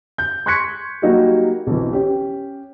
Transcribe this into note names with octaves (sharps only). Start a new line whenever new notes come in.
G6
C6 C#6 F#6 G#6 B6 C#7
F#3 G3 A#3 D#4 F#4 G4
B1 F2 E3
C#4 G4